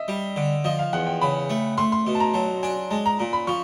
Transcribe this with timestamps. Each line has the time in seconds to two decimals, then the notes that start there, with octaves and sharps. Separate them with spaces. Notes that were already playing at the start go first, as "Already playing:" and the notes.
Already playing: D#5 E5
0.08 G3
0.36 D3
0.65 F3 D#5
0.79 F5
0.93 E2 F#5
1.07 G5
1.21 C#3 B5
1.50 A3
1.78 A3 C6
1.92 C6
2.07 B2
2.15 A5
2.20 A#5
2.34 F#3 A5
2.63 D4 G#5
2.91 G#3 A5
3.06 A#5
3.19 A#2 A#5
3.33 B5
3.47 F3 C#6